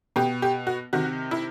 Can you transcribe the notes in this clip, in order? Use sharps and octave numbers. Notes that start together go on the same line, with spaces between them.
B2 G4
G4
F#4
C3 D#3 F#4
E4